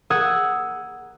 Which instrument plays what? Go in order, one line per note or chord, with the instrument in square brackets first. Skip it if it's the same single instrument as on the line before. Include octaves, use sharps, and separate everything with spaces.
[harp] A#4 F#5 D#6 E6 F#6 G#6